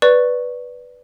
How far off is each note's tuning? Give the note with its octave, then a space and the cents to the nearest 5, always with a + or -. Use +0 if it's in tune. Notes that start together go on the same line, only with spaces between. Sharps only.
B4 +0 D5 +0 C#6 +0